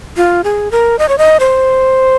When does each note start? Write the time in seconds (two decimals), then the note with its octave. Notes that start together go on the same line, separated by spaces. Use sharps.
0.17 F4
0.44 G#4
0.71 A#4
0.99 D#5
1.09 C#5
1.18 D#5
1.40 C5